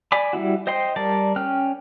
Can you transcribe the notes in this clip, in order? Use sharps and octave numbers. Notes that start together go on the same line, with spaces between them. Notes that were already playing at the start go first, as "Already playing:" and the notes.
D5 G#5 B5 D6
G3 C4 E4 F#4
C5 D#5 G5 C6
G3 A#4 D5 A5
C#4 G5 F6 F#6